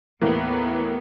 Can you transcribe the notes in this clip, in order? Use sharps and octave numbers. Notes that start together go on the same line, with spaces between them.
D#2 A2 E3 A#3 B3